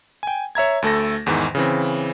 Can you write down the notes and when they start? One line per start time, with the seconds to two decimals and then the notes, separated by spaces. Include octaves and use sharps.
0.23 G5 G#5
0.55 C#5 E5 A#5 G#6
0.82 D2 A3 A4 A#6
1.26 E2 G#2 D#3 E3
1.55 C#3 E3 C4